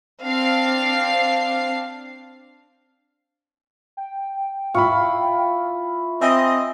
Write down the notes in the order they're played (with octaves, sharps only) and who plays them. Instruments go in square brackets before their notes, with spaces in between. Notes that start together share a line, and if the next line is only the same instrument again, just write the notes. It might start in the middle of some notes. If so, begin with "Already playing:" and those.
[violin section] C4 D4 F5 C7
[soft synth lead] G5
[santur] E4 F4 [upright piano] B5 C#6
[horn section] C4 D#5 [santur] E5 [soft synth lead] G#5